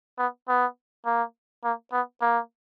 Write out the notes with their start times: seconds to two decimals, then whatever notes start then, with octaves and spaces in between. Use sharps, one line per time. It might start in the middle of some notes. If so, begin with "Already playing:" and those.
0.18 B3
0.48 B3
1.05 A#3
1.64 A#3
1.92 B3
2.22 A#3